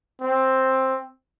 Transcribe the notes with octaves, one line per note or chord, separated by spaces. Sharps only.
C4